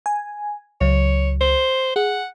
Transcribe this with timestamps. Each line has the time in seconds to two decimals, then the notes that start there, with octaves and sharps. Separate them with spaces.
0.06 G#5
0.81 C#2 F#3 C#5
1.41 C5
1.96 G#4 F#5